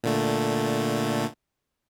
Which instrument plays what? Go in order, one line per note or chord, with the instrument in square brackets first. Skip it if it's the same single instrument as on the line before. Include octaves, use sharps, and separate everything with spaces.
[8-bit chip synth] A#2 D3 A3